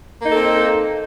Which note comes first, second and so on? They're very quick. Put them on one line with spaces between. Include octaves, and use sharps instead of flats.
A#3 D#4 A4 C4